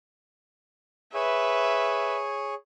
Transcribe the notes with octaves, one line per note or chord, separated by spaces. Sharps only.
G#4 B4 C#5 E5